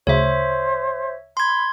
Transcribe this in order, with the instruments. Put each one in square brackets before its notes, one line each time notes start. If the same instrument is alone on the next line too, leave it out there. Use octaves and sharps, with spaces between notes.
[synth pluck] D2 C#3 [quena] C5 [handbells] C#5 E5
[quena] B5 [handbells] C6 G#6